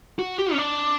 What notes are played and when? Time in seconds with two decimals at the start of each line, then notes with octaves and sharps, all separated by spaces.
0.19 F#4
0.38 G4
0.53 C#4
0.58 D4